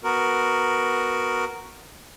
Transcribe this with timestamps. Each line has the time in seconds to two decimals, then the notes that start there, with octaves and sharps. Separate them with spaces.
0.04 B3 F#4 A#4